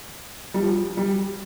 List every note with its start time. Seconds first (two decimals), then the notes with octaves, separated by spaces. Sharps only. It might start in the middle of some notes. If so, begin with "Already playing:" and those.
0.54 G3
0.62 F3
0.97 G3